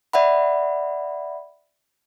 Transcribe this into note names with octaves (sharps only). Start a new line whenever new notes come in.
D5 E5 F#5 B5